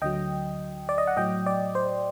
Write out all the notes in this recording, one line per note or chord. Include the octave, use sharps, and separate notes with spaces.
D2 D3 F#3 D#5 G5
D5
D#5
F#5
A2 F#3 D#5 G5
D5
C5